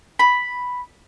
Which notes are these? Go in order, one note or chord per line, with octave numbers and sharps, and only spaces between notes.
B5